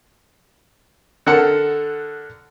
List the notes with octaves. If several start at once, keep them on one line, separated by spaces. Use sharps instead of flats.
D3 A4 A#4 F#5